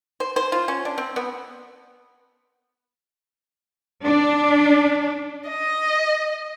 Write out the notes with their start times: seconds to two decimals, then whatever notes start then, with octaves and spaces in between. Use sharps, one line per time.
0.20 C5
0.36 C5
0.52 F4
0.68 C#4
0.85 D4
0.98 C4
1.16 B3
4.05 D4
5.49 D#5